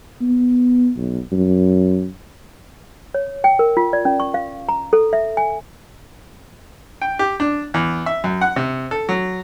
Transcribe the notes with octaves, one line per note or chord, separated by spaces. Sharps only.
B3
B1
F#2
C#5
G5
A#4
F4
D5
C#4
C#6
F5
A#5
A4
E5
G#5
G5
G4
D4
E2
E5
F#2
F#5
C3
A4
F#3